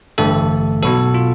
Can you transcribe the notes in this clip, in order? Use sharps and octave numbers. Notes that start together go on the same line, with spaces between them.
A1 G2 D3 A3 A4
B1 B2 B3 A4
F4